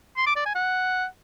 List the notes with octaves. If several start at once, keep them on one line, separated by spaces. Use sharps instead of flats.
C6
D6
D5
G#5
F#5